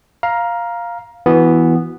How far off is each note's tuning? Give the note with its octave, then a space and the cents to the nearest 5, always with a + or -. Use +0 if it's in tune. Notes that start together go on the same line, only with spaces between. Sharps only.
F5 +0 A#5 +15
E3 +0 B3 +0 F#4 +0